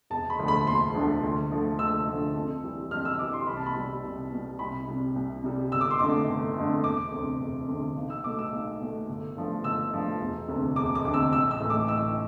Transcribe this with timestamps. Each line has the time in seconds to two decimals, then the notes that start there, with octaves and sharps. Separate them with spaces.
0.10 E1 A5
0.30 B5
0.39 D2 D3 F3 A3
0.48 B5
0.67 E1 C6
0.94 D2 D3 F3 A3
1.23 D2
1.51 D3 F3 A3
1.79 D2 E6
2.07 D3 F3 A3
2.35 F2
2.63 E3 G3
2.91 F2 F6
3.05 E6
3.19 E3 G3 D6
3.33 C6
3.47 C2 B5
3.57 A5
3.66 B5
3.75 B2 G3
4.03 C2
4.32 B2 G3
4.59 C2 B5
4.87 C3 G3
5.15 C2
5.43 C3 G3
5.72 G1 E6
5.81 D6
5.91 C6
6.00 F2 D3 A3 D6
6.28 G1
6.56 F2 D3 A3
6.84 E1 D6
7.12 D2 C3
7.40 E1
7.68 D2 C3
7.96 B1
8.10 E6
8.24 B2 A3 D6
8.39 E6
8.52 B1
8.80 B2 A3
9.08 G1
9.36 G2 F3 A3
9.64 G1 E6
9.93 G2 F3 A3
10.21 E1
10.48 D2 C3
10.76 E1 D6
10.95 D6
11.05 D2 C3
11.14 E6
11.32 A1 E6
11.51 E6
11.60 A2 E3 A3
11.70 D6
11.88 A1 E6